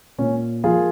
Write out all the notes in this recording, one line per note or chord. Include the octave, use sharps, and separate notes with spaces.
A#2 C#4
F3 A#3 F4 G#4